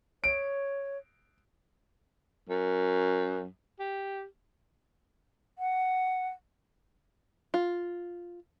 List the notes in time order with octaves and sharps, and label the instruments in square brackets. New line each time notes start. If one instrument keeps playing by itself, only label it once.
[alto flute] C#5 [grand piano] D7
[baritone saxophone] F#2
G4
[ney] F#5
[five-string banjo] F4